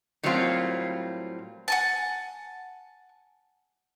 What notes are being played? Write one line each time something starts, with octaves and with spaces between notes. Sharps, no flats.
A2 F#3 G3 A#3 C4 F4
F#5 G#5 A5